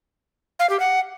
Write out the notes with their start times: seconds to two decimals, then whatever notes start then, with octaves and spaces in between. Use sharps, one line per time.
0.59 F5
0.70 G4
0.80 F#5